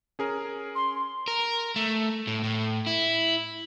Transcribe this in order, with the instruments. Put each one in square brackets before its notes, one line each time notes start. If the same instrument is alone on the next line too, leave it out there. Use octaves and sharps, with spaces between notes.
[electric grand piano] C#4 G#4 A#4
[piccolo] C6
[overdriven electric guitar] A#4
A3
A2
A2
E4